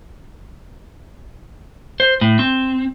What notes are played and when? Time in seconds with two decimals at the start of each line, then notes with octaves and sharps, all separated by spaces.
2.00 C5
2.21 A2
2.39 C4